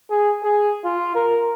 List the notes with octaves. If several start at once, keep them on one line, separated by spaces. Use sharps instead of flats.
G#4
G#4
F4
A#4